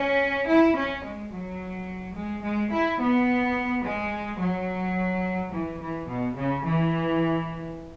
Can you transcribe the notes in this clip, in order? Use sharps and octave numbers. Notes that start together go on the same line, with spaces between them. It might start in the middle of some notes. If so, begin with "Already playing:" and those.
Already playing: C#4
E4
C#4
G#3
F#3
G#3
G#3
E4
B3
G#3
F#3
E3
E3
B2
C#3
E3